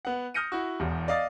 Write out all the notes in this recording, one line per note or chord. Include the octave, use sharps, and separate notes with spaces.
B3 F#5
D#6 F6 G6 A#6 C#7 D#7
E4 F#4
E1 E2
D5 D#5 F5 D#6 A6